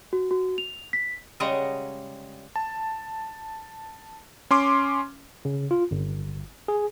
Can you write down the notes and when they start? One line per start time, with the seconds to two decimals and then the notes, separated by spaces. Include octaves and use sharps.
0.13 F#4
0.31 F#4
0.58 F7
0.93 B6
1.40 C#3 G3 G#3 D#5 F#5 A#5
2.56 A5
4.51 C#4 C6 D6
5.45 C#3
5.71 F4
5.91 G1
6.68 G#4